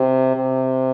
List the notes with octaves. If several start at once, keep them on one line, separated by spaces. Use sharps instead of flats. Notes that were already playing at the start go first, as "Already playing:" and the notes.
Already playing: C3
C3